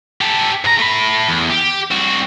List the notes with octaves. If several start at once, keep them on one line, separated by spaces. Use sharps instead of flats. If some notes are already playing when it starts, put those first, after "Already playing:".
G4 A4
G#2 A#5
A3 B5
E2
G4
C2 F#4